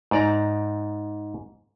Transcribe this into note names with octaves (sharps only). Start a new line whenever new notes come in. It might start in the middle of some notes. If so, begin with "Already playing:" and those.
G#2 D5 A#5